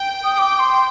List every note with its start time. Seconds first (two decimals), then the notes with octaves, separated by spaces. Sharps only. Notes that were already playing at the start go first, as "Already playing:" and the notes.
Already playing: G5
0.24 D#6
0.34 D#6
0.38 D6
0.59 C6